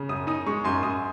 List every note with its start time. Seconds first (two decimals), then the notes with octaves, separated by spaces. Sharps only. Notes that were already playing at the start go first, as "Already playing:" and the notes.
Already playing: C#3
0.09 F#2 D#6
0.27 D#4 D#6
0.46 G#3 C#6
0.64 F#2 C6
0.83 F#2 D#6